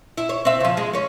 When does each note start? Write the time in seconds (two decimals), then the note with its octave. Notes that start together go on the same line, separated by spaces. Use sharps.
0.18 E4
0.29 C#5
0.45 C4 E5
0.60 C#3 F3
0.77 G#3
0.93 C#4 C#5